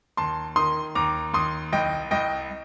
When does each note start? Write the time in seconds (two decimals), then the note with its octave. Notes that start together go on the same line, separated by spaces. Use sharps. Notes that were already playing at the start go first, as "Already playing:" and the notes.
0.17 D#2 A5 C6
0.56 D#3 C6 D#6
0.95 D#2 A#5 D6
1.33 D#2 C6 D#6
1.73 C2 D#5 G5
2.11 C2 D#5 G5